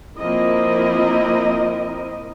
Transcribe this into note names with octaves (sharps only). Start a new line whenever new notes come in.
F3 A#3 C4 E4 A#4 D#5